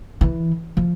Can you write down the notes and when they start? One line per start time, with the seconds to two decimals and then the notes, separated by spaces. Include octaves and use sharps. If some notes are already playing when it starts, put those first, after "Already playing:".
0.21 E3
0.77 F3